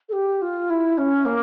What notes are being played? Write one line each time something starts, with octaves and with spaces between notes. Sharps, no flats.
A4
G4
F4
E4
C#4
A#3